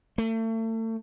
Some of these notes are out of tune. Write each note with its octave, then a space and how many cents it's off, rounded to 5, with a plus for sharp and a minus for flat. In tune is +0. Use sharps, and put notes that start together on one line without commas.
A3 +35